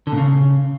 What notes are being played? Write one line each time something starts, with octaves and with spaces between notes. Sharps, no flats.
D3
A#2
C#3